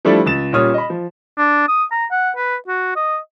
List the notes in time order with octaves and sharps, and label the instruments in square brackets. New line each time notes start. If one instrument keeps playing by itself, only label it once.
[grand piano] F3 G3 A3 D4 E4 A4
C#2 A6 E7
A#2 G3 C#4 C#5 D#6 F6
D#5 B5
F3
[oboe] D4
D#6
A#5
F#5
B4
F#4
D#5